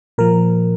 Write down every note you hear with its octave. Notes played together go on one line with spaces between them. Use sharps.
A#2 F3 A#4